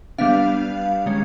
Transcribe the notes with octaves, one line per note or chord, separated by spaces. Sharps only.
G3 B3 D4 F5
D#3 G#3 C#4